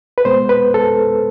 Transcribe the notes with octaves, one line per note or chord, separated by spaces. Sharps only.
B4
B2 G#3 B3 C5
B4
A4